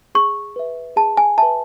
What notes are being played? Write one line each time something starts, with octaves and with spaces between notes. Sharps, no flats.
G#4 C#6
B4 E5
G#4 A5
G#5
B4 E5 A5